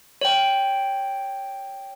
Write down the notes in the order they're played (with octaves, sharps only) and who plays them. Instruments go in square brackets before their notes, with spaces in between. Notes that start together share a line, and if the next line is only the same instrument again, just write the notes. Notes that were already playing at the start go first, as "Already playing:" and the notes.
[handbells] C#5 G5